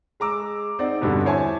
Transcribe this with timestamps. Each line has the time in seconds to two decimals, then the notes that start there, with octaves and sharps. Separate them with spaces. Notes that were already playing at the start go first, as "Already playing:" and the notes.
0.20 G#3 A#5 D6 E6
0.79 C4 D#4 D5 F#5
1.01 E2 G2 B2 D3 G3 B3
1.25 E4 C5 C#5 G#5 A5 C6